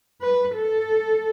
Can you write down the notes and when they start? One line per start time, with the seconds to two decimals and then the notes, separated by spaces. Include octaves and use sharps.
0.21 B4
0.55 A4